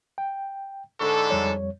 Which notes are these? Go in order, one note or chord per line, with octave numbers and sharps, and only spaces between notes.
G5
G#2 D3 A4 C#6
F2 G3 C#5